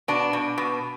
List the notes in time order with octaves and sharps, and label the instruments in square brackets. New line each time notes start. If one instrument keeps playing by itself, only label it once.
[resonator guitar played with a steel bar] B2 D4
B2
B2